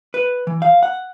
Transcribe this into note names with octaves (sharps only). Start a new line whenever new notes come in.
B4
E3
F5
F#5